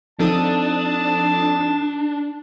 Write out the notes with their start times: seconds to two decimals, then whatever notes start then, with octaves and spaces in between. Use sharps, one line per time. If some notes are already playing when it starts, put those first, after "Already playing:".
0.19 F3 C4 D4 D#4 A4 A5 D#6